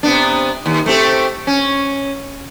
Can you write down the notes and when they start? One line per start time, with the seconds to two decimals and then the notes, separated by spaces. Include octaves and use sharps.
0.03 C3 B3 D4
0.66 D#2
0.86 A3 C4 G4
1.47 C#4